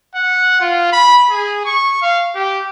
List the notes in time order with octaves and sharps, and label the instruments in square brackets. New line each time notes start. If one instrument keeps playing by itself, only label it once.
[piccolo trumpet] F#5
F4
B5
G#4
C#6
F5
G4